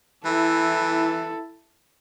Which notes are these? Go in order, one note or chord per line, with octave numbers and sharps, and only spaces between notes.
E3 E4 A4